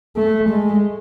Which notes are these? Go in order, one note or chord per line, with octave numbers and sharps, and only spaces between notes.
A3
G#3